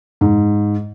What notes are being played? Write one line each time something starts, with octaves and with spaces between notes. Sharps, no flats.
G#2